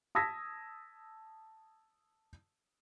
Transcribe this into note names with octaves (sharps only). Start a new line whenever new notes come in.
A5 D#6 E6 G#6 A#6 B6